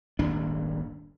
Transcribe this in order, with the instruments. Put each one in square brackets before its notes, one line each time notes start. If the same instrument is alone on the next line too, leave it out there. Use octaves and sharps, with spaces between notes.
[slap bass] D#1 G#1 D4